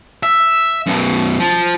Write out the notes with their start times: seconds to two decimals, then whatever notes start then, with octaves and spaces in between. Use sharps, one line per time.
0.23 E5
0.86 F#2 B2
1.40 F3